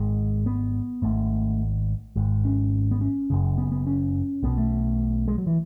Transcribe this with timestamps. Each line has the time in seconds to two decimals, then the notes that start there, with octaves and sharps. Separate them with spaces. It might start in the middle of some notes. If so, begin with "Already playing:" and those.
Already playing: G#1 G#2 G#3
0.46 B3
1.02 G#1 G#2 A3
2.16 G#1 G#2
2.45 C#4
2.91 B3
3.01 C#4
3.30 F#1 F#2 C#3
3.58 B3
3.72 B3
3.87 C#4
4.43 B1 B2 B3
4.58 A3
5.28 G#3
5.38 F#3
5.47 E3